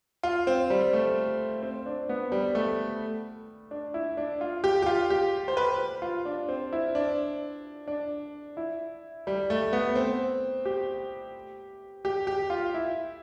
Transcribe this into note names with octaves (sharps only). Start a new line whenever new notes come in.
F4
C4
G3
A3
C4
D4
B3
G3
A3
D4
E4
D4
F4
G4
G4
F4
G4
C5
B4
F4
D4
C4
E4
D4
D4
E4
G3
A3
B3
C4
G4
G4
G4
F4
E4